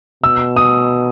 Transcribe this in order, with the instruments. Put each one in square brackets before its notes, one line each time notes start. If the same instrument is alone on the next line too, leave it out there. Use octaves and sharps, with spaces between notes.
[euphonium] B2 [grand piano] E6
[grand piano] D#6